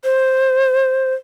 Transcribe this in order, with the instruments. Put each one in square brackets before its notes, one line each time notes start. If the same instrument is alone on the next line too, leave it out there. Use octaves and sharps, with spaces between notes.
[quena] C5